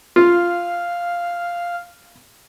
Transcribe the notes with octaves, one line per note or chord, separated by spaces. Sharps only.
F4 F5